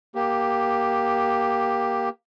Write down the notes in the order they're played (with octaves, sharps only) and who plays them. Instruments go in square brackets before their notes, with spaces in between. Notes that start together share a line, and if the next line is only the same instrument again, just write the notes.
[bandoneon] A#3 G4